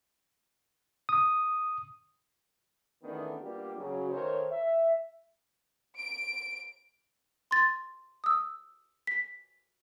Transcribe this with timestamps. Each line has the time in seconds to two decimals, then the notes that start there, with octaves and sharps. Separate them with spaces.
1.09 D#6
3.03 E2 D#3 A3 B3 C#4 D4
3.41 G3 A#3 B3 D4 F4 G4
3.77 C#3 F#3
4.10 D#3 A3 A#4 C5 C#5
4.51 E5
5.98 D7
7.51 C6 A6
8.24 D#6 E6
9.07 B6